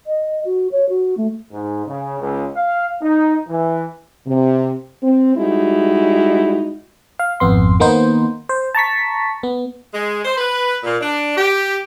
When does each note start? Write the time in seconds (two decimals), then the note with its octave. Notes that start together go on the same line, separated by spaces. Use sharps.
0.06 D#5
0.45 F#4
0.72 C#5
0.89 F#4
1.17 A3
1.52 G#2
1.87 C#3
2.20 C#2
2.56 F5
3.02 D#4
3.48 E3
4.26 C3
5.03 C4
5.36 G3 G#3 D#4 E4 F#4
7.19 F5
7.40 G#1 F2 B3 C6
7.80 D#3 A#3 B3 D#4 C5
8.49 C5
8.75 A5 A#5 C#6 B6
9.43 B3
9.94 G#3
10.25 C5
10.37 B4
10.84 A#2
11.01 D4
11.37 G4